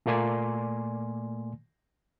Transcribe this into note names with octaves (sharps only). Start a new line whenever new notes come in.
A#2 A3 A#3 D5 G#5 C6